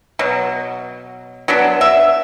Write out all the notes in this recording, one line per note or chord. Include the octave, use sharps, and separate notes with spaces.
B2 F#3
F#3 B3 D4
E5